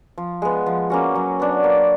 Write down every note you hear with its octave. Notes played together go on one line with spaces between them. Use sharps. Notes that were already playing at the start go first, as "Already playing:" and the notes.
F3
G#3 B3
F3
A#3 C#4 F#4
F#3
B3 D4
A#3